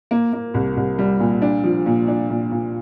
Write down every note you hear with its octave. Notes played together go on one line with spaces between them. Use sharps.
A#3
A#3
C2
C2
G3
A#2
D4
F3
A#2
D4
A#2
A#2